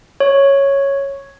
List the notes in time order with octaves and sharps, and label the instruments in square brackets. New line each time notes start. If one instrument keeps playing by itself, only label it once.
[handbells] C#5